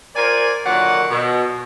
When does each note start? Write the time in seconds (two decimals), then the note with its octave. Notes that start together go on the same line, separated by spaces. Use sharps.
0.16 F4 A#4 C5 D5 G#5
0.66 A#2 D3 D#3 F#3 D5 F#5
1.11 B2